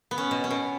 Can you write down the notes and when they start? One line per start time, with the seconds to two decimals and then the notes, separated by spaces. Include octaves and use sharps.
0.11 B3
0.18 C#4
0.31 B2
0.44 C#4
0.51 B2